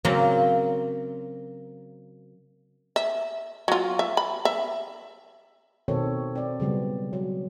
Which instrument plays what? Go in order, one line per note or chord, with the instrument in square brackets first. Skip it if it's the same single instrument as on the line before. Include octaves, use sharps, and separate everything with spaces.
[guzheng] C#3 F#3 A#3 C4
[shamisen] E5
F#3 F4
E5
B5
E5
[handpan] B2 D#3 C4 A4 C#5
C4 D5
C#3 F#3 G3 B3
F#3